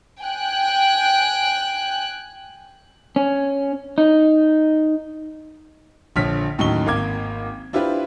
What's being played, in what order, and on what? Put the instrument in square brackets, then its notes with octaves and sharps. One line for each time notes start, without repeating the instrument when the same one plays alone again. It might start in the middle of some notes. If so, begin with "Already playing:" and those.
[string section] G5 G#5 F#6
[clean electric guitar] C#4
D#4
[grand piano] A#1 D3 F3 C#5 F6 B6
D#2 A2 F#3 C#4 D#4 G7
G#1 A#3 F5 D6 G#6
D4 E4 F4 G4 B4 C5